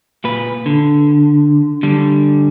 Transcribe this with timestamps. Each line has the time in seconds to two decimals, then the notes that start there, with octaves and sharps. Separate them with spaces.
0.25 A#2 B4
0.66 D3
1.83 D3 G3